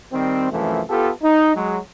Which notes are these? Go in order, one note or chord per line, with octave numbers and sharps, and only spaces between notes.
D#3 G3 C4
C2 F#2 E3 F3 A3
B3 F4 G4 A4
D#4
F#3 G#3